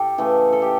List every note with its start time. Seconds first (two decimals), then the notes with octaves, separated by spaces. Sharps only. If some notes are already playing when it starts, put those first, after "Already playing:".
Already playing: A2 G4 A4
0.18 C#3 E3 A3
0.52 A4
0.62 G4